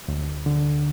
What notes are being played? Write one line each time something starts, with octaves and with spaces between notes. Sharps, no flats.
D2
D3